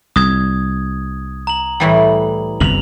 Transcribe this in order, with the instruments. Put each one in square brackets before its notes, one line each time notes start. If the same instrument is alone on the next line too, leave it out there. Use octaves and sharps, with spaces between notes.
[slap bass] C2 [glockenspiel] D#6 G#6
[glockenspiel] A#5 F#7
[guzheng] A2 E3 G3
[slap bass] G1 C2 F2 [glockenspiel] F7 F#7